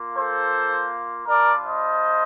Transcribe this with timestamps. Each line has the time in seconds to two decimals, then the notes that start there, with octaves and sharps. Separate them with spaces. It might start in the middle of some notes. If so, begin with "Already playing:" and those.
Already playing: A#3 F4
0.15 A4 C5
1.27 G3 D4 F4 A#4 D5
1.65 C5 D#5